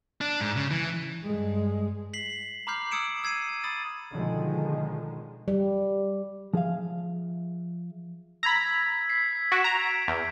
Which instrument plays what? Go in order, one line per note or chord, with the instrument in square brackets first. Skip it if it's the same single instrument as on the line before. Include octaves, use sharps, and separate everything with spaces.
[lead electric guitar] D4
G#2
C#3
E3
[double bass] G2 G#3
[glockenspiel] B6 C7 F#7
A#5 B5 D6 F6 G6 C7
D#6 E6 G#6 C#7 D7 E7
E6 G#6 C7 D#7
B5 D#6 A6 D#7
[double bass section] B2 D3 D#3 F3 G#3
[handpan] G3
[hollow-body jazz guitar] F3 G#4 E5 F5
[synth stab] A#5 B5 [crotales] E6 G#6 B6
[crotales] B6 C7
[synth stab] F#4 [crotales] D7 E7
[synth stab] A#5
E2